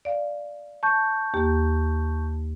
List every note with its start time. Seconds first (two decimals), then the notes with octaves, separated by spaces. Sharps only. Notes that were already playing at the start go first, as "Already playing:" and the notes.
0.05 D5 F5
0.83 A5 C#6 G6
1.34 D#2 A#3 G4